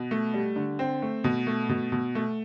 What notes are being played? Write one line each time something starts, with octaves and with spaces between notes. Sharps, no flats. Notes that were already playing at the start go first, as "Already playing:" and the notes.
Already playing: B2
A3
G3
D3
C4
A3
B2
A3
B2
B2
A3